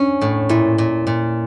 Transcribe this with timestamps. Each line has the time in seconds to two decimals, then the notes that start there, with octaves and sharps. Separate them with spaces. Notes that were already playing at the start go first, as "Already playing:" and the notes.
Already playing: C#4 D4
0.22 A2
0.49 A#2 E4
0.78 A#2
1.07 A#2